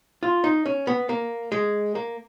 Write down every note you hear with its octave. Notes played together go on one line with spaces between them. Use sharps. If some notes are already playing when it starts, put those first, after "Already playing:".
F4
D#4
C#4
B3
A#3
G#3
A#3